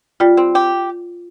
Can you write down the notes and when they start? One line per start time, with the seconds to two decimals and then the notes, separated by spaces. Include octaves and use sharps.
0.20 G3 F4
0.37 C4
0.55 G4